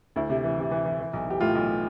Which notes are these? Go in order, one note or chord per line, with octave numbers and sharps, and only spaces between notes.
D2 E4
C3
E3
C3
E3
E3
E3
B1
E3 G4
A2 F4
B1